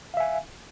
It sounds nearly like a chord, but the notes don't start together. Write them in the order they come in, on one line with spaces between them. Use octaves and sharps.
F5 E5 G#5